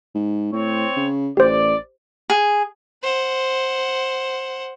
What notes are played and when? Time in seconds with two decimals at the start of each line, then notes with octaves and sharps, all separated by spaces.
0.15 G#2
0.52 A2 C4 C#5
0.96 C#3
1.37 A1 G4 C5 D5
2.30 G#4
3.03 C5 F#5